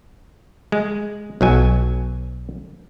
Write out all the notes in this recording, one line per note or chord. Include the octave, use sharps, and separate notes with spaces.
G#3
B1 F#3 G#5